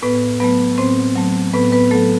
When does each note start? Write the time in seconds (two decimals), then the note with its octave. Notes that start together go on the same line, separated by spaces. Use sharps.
0.02 A2 B3 B4
0.40 F#3 A3 B3 B4
0.78 A2 C4 C5
1.16 F#3 A3
1.53 A2 B3 B4
1.72 B3 B4
1.91 A3 A4
1.95 F#3